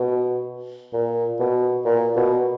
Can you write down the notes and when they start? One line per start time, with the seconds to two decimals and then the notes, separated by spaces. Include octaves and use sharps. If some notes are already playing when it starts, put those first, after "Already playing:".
Already playing: B2
0.93 A#2
1.39 B2
1.85 A#2
2.16 B2